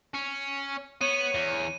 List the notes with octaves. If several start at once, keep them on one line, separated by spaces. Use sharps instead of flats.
C#4
B3 C#5 D#7
E2